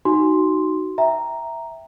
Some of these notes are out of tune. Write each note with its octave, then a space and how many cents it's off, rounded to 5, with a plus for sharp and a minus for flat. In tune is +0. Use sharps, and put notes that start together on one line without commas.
D#4 +0 F#4 +15 C6 +0
E5 +0 G5 +0 A#5 +0